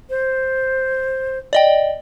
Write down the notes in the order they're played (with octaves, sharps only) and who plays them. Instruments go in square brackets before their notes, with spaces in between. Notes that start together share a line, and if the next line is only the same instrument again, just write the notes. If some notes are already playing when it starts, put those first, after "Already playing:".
[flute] C5
[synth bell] D5 D#5 G5